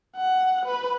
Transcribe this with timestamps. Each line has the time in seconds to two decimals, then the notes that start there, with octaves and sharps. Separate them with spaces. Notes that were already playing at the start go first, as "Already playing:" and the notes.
0.16 F#5
0.66 B4